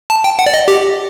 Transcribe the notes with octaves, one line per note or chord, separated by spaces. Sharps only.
A5
G5
F#5
D5
D#5
G4